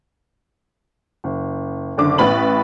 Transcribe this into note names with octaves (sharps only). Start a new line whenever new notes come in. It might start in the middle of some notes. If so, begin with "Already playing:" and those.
F#1
F#1 D3 D6
A1 B3 B4 B5 F#7